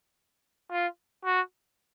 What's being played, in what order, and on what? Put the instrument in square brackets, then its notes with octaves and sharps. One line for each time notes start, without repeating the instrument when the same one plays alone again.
[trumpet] F4
F#4